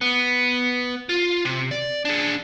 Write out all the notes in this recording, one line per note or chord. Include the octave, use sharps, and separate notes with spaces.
B3
F4
C3
D5
D4 G#4